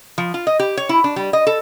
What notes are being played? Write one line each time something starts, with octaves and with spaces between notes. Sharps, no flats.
F3
F4
D#5
G4
C#5
E4
D4
G3
D#5
A4